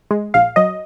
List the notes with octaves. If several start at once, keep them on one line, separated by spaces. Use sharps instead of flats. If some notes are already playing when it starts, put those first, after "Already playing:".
G#3
A#1 F5
F#3 D#5